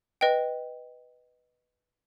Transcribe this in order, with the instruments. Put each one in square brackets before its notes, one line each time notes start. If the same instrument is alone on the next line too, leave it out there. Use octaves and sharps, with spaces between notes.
[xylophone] B4 D#5 G5